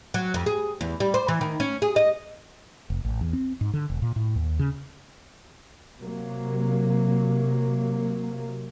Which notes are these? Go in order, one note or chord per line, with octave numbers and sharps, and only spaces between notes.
F#3
F2
G#4
E2
G3
C5
E3
D#3
C#4
G#4
D#5
F1
A1
E2
C4
G#2
D3
E1
A#2
A2
D#2
C#3
C3 F#3 A#3